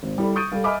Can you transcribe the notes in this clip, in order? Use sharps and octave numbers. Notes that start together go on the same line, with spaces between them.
G#1
G3 E4 A4 D5
C#6 D#6 G6 A6 D7 D#7
G3 A4 F5
D#5 E5 G#5 B5 D6 F6